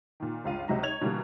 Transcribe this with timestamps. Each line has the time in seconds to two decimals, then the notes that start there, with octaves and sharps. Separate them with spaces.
0.20 A#2 D#3
0.44 G1 C#2 F4 F5 D#7
0.68 C#2 C3 F#3 D#5 E5 A#5
0.82 D#4 C#5 G#6 F7
1.01 B2 D3 E3 G3 A#3